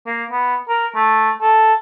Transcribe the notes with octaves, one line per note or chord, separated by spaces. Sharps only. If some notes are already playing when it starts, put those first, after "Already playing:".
A#3
B3
A#4
A3
A4